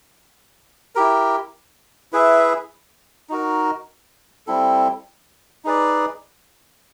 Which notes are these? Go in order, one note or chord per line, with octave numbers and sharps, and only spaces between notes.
E4 G4 A#4
E4 G#4 B4 E5
D#4 F#4 A#4
G3 C4 E4 A4
D#4 G#4 B4 D5